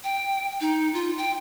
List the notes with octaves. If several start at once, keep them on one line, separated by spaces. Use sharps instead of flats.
G5
D#4
F4
G5